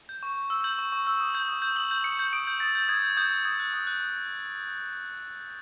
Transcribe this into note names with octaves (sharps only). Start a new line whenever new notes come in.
G6
C#6
C#6
E6
G6 F#7
C#6
C#6
E6
D#6
G6
D#6
G6
D#6 F#7
G6
D#6 C#7
G6
D#6 D7
G6
D#6 A6
G6
D#6 G#6
G6
D#6 G6
G6
D#6 G#6
F#6
D#6
F#6
D#6